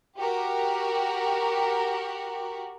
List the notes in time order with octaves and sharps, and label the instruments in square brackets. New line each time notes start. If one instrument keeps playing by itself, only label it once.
[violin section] F#4 G4 A#4